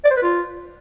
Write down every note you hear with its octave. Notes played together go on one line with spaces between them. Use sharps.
D5
C5
B4
F4